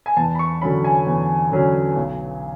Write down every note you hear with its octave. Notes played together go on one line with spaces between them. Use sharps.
G#5
E2 A5
B5
C#6
D3 F#3 C#4 B5
G#5
E2
D3 F#3 C#4
B1